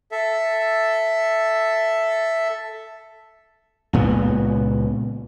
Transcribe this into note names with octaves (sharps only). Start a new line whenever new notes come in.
A4 E5
C#2 A#2 B3